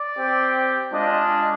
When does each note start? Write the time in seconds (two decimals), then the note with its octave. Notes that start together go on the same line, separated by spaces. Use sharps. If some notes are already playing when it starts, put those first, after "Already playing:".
Already playing: D5
0.18 C4 G4
0.92 G#3 D4 F4 D#5